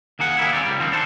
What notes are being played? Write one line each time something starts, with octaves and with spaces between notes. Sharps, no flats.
D#2 A#3 G#4 F#5
G3 A#3 E4 G#4
C4 E4 G4 D5
C#2 G3
D#3 F3 C4
D4 A4 C5